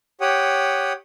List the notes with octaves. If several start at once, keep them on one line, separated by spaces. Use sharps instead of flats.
G4 C#5 F#5 G5 D#6